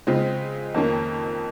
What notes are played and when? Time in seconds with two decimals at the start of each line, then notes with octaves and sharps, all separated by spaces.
0.07 C#3 G#3 C4 F4
0.74 F2 D#3 A#3 C#4